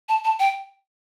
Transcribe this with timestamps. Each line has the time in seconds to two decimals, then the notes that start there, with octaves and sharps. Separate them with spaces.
0.09 A5
0.24 A5
0.40 G5